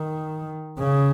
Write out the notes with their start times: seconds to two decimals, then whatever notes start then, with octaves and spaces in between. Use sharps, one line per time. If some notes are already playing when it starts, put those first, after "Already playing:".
Already playing: D#3
0.79 C#3